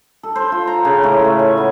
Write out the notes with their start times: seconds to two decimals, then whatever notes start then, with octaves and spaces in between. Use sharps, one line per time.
0.23 A4
0.35 C5
0.52 F4
0.67 A#5
0.85 C#3
1.03 A2
1.24 A3
1.39 G#5
1.57 B3